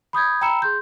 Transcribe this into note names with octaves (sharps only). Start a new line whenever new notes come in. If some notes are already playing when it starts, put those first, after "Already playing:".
B5 D#6 G6 G#6
G5 A#5 B5 E6 C#7 E7
G#4 C6 G6